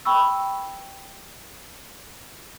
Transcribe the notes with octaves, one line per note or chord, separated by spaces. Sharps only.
G5 B5 C#6 E6